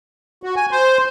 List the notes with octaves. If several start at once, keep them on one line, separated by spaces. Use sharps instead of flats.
F#4
G#5
C5